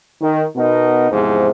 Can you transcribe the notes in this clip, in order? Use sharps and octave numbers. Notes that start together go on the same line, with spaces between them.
D#3
B2 B3 D#4 A#4
E2 G#2 C3 F3